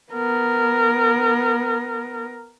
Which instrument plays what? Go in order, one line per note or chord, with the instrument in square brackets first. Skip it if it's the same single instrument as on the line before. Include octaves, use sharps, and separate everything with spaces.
[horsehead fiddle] B3 A#4